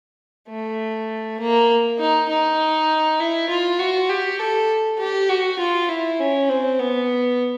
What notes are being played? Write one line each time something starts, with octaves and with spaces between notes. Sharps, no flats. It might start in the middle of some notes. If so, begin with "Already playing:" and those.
A3
A#3
D#4
D#4
E4
F4
F#4
G4
A4
G4
F#4
F4
E4
C#4
C4
B3